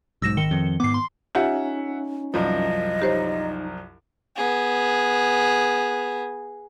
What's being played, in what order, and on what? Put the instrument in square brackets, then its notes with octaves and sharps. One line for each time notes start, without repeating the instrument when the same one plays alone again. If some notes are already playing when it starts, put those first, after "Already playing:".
[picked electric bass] B1 G#2 [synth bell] E6 A#6 E7
[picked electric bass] G#1 [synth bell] D#3 C#7 G7
[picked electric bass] F2
[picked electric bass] G#2 B3 [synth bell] D6 C7
[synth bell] C6
[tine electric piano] C#4 D#4 [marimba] F4 G4 [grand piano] E5 F#5
[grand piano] C2 F#2 F3 [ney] D#5
[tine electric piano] D#4 [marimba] G4 C5 C#5
[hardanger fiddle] B3 G#4